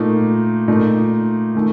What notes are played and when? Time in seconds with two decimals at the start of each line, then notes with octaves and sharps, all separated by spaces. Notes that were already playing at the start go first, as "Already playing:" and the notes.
Already playing: A#2 A3 D#4
0.68 A#2 A3 D#4
1.55 D#3 A3